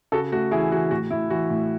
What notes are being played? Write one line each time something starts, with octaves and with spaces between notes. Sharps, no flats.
C#3 F#4 A4
A3 F#4
E3 E4 G#4
E3 F#4
A2 F#4
A2 E4
E3 F#4
A2